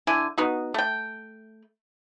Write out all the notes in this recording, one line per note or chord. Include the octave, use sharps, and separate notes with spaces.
D3 E4 G#5
B3 D#4 F#4
A3 G5